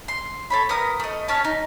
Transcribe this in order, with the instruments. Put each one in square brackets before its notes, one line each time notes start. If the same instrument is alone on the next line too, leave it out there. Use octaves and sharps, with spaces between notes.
[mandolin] C6
A4 C#5 B5
B3 A#4 D#6
A3 D#5
C#4 C#5 A5
D#4